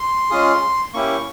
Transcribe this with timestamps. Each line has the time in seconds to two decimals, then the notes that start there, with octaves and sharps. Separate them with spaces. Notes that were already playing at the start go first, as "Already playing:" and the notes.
Already playing: C6
0.30 G#3 C#4 F4 G#4
0.94 A#3 C#4 E4 G4 C#6